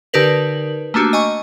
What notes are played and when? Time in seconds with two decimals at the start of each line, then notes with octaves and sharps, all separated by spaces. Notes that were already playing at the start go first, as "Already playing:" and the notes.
0.13 D3 D#4 G4 A#4 B4 F#7
0.94 A3 A#3 D4 F#4 G4
1.13 D#5 G#5 C#6